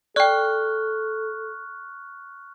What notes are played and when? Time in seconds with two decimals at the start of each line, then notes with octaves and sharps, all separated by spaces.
0.16 A4 D5 G5 C#6 F6 F#6